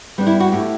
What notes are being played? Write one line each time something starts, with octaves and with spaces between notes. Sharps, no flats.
G3 B3 D4
E4
F#4
A2 G4